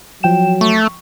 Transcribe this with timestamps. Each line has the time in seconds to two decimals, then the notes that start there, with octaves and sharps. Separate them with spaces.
0.23 F3 F#3 G5 E7
0.61 A3 C#6